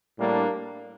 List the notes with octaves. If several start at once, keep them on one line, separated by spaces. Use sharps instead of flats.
A2 G3 A#3 D4